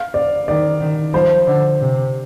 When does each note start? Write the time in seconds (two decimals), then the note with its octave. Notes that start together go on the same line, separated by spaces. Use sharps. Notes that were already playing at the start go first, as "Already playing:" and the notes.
Already playing: F5
0.14 D5
0.48 D#3 D5
0.80 D#3
1.13 F3 C5
1.47 D3
1.80 C3